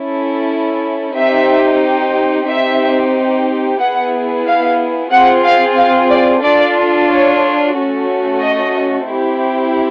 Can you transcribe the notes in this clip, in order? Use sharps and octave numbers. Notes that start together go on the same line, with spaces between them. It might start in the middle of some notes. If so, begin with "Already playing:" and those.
Already playing: C#4 E4 A4
C4 D#4 G4 E5
C4 D#4 G4 E5
B3 E4 G#4 F#5
F5
C4 F4 G#4 F#5
F5
F5
D5
D4 F4 A4 D5
C#5
A3 C#4 F#4 A4
D#5
C4 E4 G4